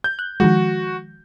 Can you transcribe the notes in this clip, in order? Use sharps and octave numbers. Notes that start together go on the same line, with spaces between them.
G6
F#6
D#3 F3 G#3 F#4